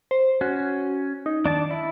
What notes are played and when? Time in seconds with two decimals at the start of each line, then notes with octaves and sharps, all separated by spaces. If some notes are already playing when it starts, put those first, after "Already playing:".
0.11 C5
0.41 C#4 F#4
1.26 D#4
1.46 D#3 D4 D5 A5
1.71 E4